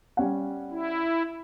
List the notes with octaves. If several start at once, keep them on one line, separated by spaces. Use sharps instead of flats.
G3 C#4 F#5
E4